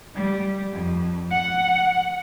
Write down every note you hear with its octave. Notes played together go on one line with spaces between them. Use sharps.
G3
F2
F#5